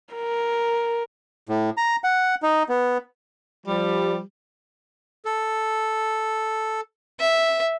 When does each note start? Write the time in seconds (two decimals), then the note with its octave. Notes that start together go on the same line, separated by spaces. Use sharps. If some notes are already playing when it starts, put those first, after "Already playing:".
0.15 A#4
1.49 A2
1.77 A#5
2.04 F#5
2.42 D#4
2.69 B3
3.67 F3 G3
5.25 A4
7.20 E5